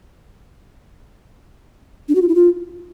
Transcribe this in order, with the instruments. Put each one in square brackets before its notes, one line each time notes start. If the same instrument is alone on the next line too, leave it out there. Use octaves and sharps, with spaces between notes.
[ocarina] D4
F#4
F4
E4
F4